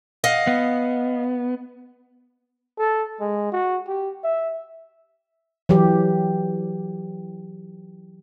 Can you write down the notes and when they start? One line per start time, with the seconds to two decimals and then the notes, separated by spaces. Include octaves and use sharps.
0.24 D#5 F5 F#5
0.47 B3
2.79 A4
3.20 G#3
3.52 F#4
3.88 G4
4.24 E5
5.69 E3 F#3 G4